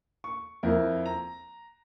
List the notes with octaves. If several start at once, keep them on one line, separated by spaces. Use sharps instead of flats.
C#6
F2 E4 A#4
A#5